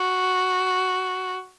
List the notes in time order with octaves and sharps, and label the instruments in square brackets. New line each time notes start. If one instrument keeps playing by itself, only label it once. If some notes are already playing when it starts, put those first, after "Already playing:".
Already playing: [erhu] F#4